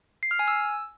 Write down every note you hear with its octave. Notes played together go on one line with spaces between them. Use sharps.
C7
F6
G#5
E6